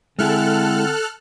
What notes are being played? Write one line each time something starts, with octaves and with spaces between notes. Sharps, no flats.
D3 G#3 C4 E4 G#4 A4 F6 F#6